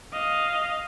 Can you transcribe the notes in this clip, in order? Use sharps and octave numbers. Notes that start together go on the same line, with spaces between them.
D#5 F5